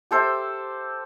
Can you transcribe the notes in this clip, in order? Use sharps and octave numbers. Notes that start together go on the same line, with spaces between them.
G4 A4 C5 E5